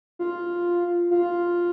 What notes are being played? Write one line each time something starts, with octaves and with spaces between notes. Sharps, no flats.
F4
F4